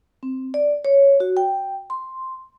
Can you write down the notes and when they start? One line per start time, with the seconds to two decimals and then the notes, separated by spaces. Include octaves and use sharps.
0.23 C4
0.54 D5
0.85 C#5
1.20 F#4
1.37 G5
1.90 C6